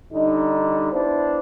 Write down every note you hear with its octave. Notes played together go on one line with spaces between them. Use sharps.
D3 G3 D#4
B3 D4 E4 C5